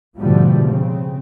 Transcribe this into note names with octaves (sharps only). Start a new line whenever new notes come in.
G#2 B2 D3 F3 G3 A3
C#3 C4